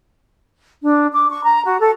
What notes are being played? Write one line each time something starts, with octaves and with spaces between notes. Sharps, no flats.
D4
D6
C#6
A#5
F#4
A4